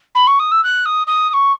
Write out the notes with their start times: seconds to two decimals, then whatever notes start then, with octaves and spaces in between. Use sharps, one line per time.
0.15 B5
0.27 C#6
0.39 D#6
0.51 E6
0.63 F#6
0.85 D#6
1.07 D#6
1.29 D#6
1.33 C#6